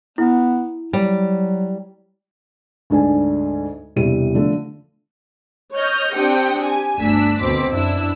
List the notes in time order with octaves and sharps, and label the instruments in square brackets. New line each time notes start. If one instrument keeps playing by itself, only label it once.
[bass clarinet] B3 [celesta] E4
[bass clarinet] F#3 [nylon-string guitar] G3
[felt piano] D2 G#2 D4 A4 G#5
E1 C3 G3 E4 D#7
D3 F3 A3
[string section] C#5 D#5 F6 G6
C4 D4 G4 G5 D#6 C#7
G4 G#5
G1 D2 D4 E6 B6
D2 B2 C4 D6 B6
F#2 D4 E4 E6